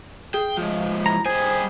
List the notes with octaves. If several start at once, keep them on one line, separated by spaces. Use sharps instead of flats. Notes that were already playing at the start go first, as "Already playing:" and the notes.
G#4 G5
F3 G#3
E4 A#5
G3 G#4 C5 G#5